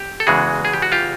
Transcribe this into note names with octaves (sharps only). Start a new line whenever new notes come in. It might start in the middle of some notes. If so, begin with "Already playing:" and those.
Already playing: G4
A4
E2 C#3 E3 G#3 F#4 G#4
G#4
G4
F#4
F4 G4